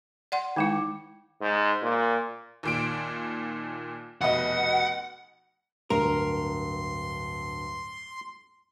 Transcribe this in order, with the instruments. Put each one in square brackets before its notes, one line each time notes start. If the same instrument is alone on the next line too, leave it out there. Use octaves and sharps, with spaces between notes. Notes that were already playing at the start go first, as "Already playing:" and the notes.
[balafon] D5 F#5 C6
[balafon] D#3 G#3 E4 [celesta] D#4 G5 D6
[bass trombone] G#2
A#2
[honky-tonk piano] D#2 A#2 D7
[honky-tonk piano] F1 B2 D#5 [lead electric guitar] F#5
[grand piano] D1 G2 [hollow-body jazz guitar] A#4 [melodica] C6